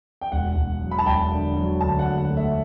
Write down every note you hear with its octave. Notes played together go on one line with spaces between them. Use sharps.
G5
E1 F#5
E1
F#3
B5
A5
E1 G5
D3
F#3
D2 A5
F#5
D2
F#5
A3
E5